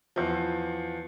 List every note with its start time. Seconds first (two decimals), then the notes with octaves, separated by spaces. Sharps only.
0.16 E2 F3